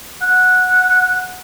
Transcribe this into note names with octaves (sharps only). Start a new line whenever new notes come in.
F#5